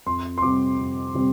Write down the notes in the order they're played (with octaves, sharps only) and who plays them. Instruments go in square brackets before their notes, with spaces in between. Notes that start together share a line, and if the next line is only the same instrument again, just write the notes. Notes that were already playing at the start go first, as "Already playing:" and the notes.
[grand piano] F2 C6
C6
C3 G3 C4 D6
F2
C3 G3 C4